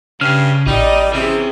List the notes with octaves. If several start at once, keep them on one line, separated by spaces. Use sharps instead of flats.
G2 C#3 F6 C7
A1 G3 D#4 D5 D#5
C3 E3 C#4 G#4